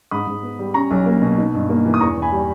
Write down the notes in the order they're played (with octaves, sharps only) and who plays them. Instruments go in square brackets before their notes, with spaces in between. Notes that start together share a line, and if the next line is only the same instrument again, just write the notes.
[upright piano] G#2 B5 D#6
G#2
B3
G3
C#4 A#5 C#6
B1
A#3
B2
D#4
G2
A#3
E3
D#6
E2 A#5 C#6
E2
G#5 B5
G3